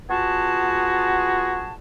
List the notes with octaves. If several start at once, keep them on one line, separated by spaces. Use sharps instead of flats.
B3 F4 F#4 G#4 A5